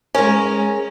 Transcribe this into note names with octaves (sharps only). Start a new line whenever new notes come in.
G#3 C#4 A#4